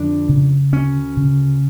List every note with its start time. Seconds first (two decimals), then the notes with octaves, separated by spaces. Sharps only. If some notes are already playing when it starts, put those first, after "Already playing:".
Already playing: F2 D3 D4
0.29 C#3
0.72 D2 C#4
1.17 C#3